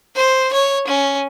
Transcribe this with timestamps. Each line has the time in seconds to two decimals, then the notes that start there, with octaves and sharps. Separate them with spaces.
0.16 C5
0.53 C#5
0.88 C#4